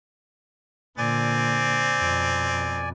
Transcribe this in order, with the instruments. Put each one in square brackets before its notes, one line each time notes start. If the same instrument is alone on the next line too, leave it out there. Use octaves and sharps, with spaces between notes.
[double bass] A#2 D3 [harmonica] C4 [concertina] D5 G#5
[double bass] F2 B2